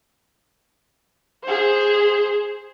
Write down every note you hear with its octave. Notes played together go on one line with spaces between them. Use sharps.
G#4 C5